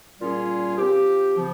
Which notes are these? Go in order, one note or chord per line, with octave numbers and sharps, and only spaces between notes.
A#2 G3 C#4 F4 G#4
F3 C4 G4
C#3 F3